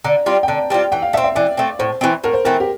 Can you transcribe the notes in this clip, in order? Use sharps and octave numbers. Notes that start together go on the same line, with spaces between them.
D3 A#5
G3 C4 F4
G5
D3 A5
G3 C4 F4
E3 G5
F5
A3 E5
C4
E5
E3 D5
A3 C4
A2 C5
E3 A3 C4
A2 A#4
C5
E3 A3 C4 A#4
G4